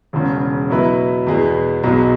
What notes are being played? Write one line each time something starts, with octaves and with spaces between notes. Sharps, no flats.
E1 E2 C#3
B2 F#3 E4 B4
E2 B2 B3 G#4
B1 B2 F#3 B3 G#4